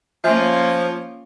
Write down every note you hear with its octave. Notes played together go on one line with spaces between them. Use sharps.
F3 A#3 C#4 F4 E5 G#5